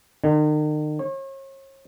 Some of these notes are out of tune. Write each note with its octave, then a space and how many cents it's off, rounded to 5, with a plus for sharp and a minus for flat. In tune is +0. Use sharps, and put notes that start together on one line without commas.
D#3 -40
C#5 -40